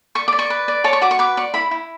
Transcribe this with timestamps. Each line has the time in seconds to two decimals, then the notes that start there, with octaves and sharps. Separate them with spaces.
0.15 D5 C#6
0.28 D6
0.32 D5
0.39 C#6
0.50 B4
0.68 D5
0.84 C#5 A5
0.93 C#6
1.02 F#4 D6
1.11 C#6
1.19 B4 D6
1.37 D5 C#6
1.54 E4 B5
1.71 E4